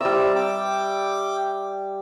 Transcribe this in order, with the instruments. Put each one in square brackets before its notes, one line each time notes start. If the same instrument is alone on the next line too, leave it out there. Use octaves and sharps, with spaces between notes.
[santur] G3 E5 [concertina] C4 D5 A#5
[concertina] G5 D6